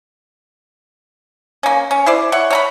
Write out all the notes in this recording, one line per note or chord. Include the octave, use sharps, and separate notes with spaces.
A#3 C#4
C#4
E4 C5 D5
E4 C#5 F#5
C#5 A#5 B5